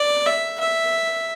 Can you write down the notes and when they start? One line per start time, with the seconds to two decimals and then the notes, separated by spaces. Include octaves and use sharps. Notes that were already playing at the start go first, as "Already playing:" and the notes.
Already playing: D5
0.26 E5
0.60 E5